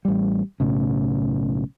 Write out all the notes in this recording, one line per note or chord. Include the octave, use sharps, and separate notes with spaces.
A1 G3
B1 A2 C#3